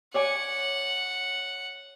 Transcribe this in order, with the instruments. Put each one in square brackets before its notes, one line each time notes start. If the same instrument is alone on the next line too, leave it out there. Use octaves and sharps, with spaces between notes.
[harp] C#5 D5 G#5 [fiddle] F#5